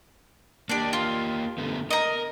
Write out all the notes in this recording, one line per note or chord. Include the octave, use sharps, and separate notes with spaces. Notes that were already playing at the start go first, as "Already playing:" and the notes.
A#3 D4 G4 D5
F4
D3 A3 B3
A#4 D#5 A#5